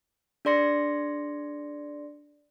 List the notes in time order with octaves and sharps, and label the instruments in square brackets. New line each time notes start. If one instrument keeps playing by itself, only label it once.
[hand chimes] D4 G#4 D5 C6 A#6 C#7